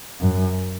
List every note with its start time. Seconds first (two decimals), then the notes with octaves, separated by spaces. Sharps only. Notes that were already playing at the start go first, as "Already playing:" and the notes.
0.21 F#2